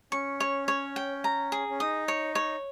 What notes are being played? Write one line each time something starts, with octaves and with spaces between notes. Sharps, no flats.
C#4 C#6
C#5
C#5
G5
A#5
G#4
C#4
D#4 D#6
C#5
C#5